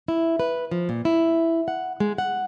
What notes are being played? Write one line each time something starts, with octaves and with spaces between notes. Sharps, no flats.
E4
B4
F3
A#2
E4
F#5
G#3
F#5